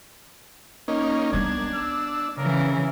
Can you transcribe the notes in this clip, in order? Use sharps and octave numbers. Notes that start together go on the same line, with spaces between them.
A#3 C#4 D#4
G3 B3 D4 G#6
E6
C#3 E3 A#4